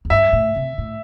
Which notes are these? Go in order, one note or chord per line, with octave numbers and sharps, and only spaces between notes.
E2
G2 E5
A2
C3
A2